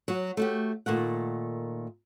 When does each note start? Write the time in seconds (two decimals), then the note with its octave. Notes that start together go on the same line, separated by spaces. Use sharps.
0.08 F#3 F#4
0.37 A3 F#4 G4
0.86 A#2 D#3 A3 F#5